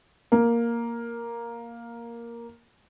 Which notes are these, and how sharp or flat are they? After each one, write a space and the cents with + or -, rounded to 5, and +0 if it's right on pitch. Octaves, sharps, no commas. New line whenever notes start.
A#3 +5